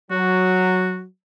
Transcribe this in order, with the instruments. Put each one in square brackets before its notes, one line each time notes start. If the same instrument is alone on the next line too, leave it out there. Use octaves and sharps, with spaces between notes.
[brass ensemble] F#3 [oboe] F#4